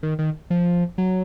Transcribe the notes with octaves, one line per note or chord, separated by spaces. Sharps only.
D#3
D#3
F3
F#3